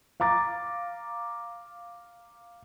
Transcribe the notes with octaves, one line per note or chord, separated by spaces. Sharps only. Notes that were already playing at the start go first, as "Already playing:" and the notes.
F5 A#5 D6 A6